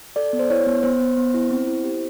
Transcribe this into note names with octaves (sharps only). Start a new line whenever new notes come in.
A4 D5
B3
C5
E4 C#5
B3
B3 C5
B3
B3
E4
C4
E4
G4